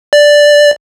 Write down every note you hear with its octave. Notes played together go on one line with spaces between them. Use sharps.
D5